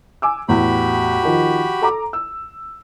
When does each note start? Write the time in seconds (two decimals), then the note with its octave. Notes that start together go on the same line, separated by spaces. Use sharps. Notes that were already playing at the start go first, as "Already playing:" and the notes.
0.22 G#5 D6 E6
0.49 E2 A2 F#4 G4 B5
1.23 D#3 F3
1.82 A4 A#5 D6
2.13 E6